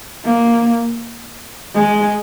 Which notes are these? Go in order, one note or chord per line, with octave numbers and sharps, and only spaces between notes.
A#3
G#3